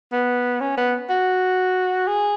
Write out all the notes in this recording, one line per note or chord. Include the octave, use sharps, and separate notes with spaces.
B3
C#4
B3
F#4
G#4